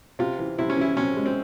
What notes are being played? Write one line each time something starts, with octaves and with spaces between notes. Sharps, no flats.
C3 F4
E3
C3 E4
C#4
E3 E4
C3 C#4
G#3
C4